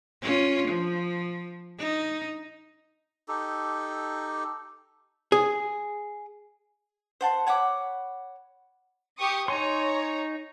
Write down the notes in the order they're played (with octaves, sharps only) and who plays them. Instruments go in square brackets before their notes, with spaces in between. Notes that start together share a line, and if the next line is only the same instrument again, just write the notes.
[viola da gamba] C#4 F4
F3
D#4
[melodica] D#4 G4 A4
[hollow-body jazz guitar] G#4
[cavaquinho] C5 F#5 A5
C#5 F#5 B5 D6
[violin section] G4 C#6 D#6
[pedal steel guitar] D#4 G#5 C6 [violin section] C#5 A#5